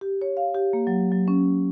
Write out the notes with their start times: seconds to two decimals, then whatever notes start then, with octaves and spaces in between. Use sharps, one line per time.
0.01 G4
0.22 C#5
0.37 F5
0.55 G4
0.73 A#3
0.87 F#3
1.12 F#3
1.28 C#4